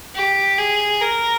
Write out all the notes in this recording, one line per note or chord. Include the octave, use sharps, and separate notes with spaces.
G4
G#4
A#4